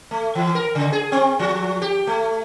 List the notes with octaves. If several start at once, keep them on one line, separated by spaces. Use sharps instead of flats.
A3
E3
A#4
C#3
G#4
C4
F3
G4
A3